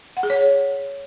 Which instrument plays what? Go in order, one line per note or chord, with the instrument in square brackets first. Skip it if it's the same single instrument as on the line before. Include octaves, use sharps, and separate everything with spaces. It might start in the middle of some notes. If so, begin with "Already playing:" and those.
[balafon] F#5
G#4
C#5